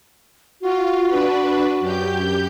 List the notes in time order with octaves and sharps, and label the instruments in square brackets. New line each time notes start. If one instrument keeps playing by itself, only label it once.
[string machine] F4 [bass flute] F#4
[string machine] D4 B4
F#2 G4 G6